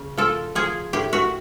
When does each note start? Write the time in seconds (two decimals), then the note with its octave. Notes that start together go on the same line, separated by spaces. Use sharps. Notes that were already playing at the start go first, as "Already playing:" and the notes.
Already playing: C#3
0.17 F3 A4
0.55 F3 G#4
0.93 A2 G4
1.13 F#4